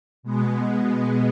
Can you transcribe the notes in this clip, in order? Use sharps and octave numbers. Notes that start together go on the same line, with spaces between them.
B2 G#3 B3